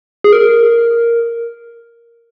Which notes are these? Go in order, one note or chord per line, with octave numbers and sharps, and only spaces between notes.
G#4
A#4